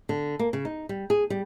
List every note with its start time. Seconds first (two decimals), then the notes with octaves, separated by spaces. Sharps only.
0.09 D3
0.39 A#3
0.53 C#3
0.65 D#4
0.89 G3
1.10 G#4
1.30 G3